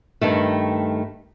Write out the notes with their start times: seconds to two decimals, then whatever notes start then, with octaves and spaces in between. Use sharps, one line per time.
0.21 G2 D#3 A3